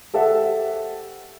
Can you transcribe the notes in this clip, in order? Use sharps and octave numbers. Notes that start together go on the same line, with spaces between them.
G4 A4 C5 E5 F#5